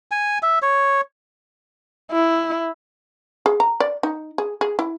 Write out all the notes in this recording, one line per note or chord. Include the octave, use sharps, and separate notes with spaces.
G#5
E5
C#5
E4
G#4
A#5
D5
D#4
G#4
G#4
E4